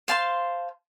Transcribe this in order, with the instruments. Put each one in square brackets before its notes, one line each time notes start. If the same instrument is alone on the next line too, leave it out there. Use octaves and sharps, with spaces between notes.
[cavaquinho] C5 F5 A5 C6